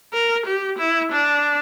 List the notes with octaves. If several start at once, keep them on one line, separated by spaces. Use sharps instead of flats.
A#4
G4
E4
D4